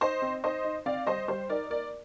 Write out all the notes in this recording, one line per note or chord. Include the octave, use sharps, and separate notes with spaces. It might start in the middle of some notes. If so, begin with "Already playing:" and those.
D#4 C5 D#5
C4
D#4 C5 D#5
D#4
C4 D5 F5
G3 C5 D#5
G3 C5
D#4 A#4 D5
A#3 A#4 D5